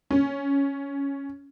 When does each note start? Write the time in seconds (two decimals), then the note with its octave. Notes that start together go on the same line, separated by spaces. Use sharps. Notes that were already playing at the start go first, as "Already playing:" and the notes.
0.11 C#4